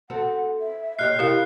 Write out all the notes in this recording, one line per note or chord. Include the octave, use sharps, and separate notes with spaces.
C4 F#4 A4 F#5
E5
A#2 G4 C#5 D#5 F6 F#6 C7
C3 E4 G4 A#4 F5